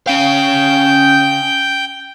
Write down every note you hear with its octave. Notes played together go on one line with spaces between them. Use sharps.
C#4 F5 G5 G6